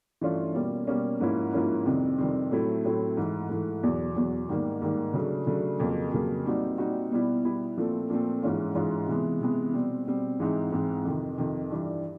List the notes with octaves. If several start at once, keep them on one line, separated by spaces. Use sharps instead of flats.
G2 E3 A3 C#4 F4
B2 G3 A#3 C#4
B2 G3 A#3 C#4
G#2 F3 A#3 C#4 E4
G#2 F3 A#3 C#4 E4
F2 C3 D#3 G3 C4
F2 C3 D#3 G3 C4
A2 F#3 A3 C4 E4
A2 F#3 A3 C4 E4
G#2 E3 A3
G#2 E3 A3
E2 B2 F#3
E2 B2 F#3
G#2 D#3 G3 A#3
G#2 D#3 G3 A#3
C#3 F#3 A3 D4
C#3 F#3 A3 D4
F2 C#3 F#3 A#3
F2 C#3 F#3 A#3
A#2 G3 C4 D#4 F#4
A#2 G3 C4 D#4 F#4
B2 G3 B3 E4
B2 G3 B3 E4
A#2 F3 A3 C4
A#2 F3 A3 C4
G#2 E3 G#3 C#4 F4
G#2 E3 G#3 C#4 F4
C3 E3 G#3 B3
C3 E3 G#3 B3
B2 G3 C4
B2 G3 C4
G#2 E3 G#3 C4 D#4
G#2 E3 G#3 C4 D#4
F2 C3 D#3
F2 C3 D#3
G2 E3 G3